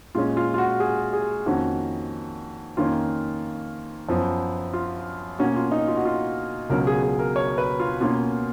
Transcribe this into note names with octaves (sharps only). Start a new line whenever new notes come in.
A#2 G#3 C#4 F4
F4
F4
F#4
G#4
G#4
F2 D#3 A#3 C#4 F#4
F2 D#3 A#3 C#4 F4
F#2 F3 B3
F4
B2 A#3 C#4 F#4
F4
D#4
F4
F#4
F4
C#2 B2 F#3 C#4 A#4
G#4
G#4
A#4
C#5
B4
F4
B2 A#3 C#4 F4